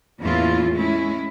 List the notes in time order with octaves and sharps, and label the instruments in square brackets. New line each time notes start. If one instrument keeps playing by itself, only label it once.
[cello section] E2 A2 A#3 C#4 E4 F4
G#3 A3 C#4 E4